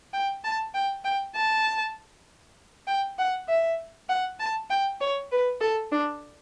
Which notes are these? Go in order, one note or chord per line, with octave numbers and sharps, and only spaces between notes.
G5
A5
G5
G5
A5
G5
F#5
E5
F#5
A5
G5
C#5
B4
A4
D4